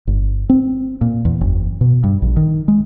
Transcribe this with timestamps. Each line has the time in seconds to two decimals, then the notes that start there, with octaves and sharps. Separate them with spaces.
0.07 G1
0.50 C4
1.01 A#2
1.25 E2
1.41 F#1
1.81 B2
2.04 G2
2.22 A#1
2.37 D#3
2.68 G#3